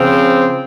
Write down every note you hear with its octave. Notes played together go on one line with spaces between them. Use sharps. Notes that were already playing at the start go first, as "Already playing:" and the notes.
Already playing: C#3 F3 C4